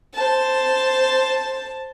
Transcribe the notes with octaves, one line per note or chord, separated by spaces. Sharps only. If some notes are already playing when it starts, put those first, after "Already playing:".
C5 A5